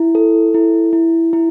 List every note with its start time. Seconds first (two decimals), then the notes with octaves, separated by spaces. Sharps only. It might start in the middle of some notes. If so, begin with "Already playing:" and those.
Already playing: E4
0.15 A4
0.54 E4
0.93 E4
1.33 E4